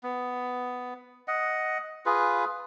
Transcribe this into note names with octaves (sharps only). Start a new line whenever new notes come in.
B3
D#5 F#5
F4 G#4 B4